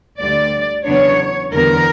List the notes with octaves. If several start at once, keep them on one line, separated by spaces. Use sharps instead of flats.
D2 D3 G3 D5
E2 C#3 F#3 B3 D4 C#5
E2 D3 G3 B3 A#4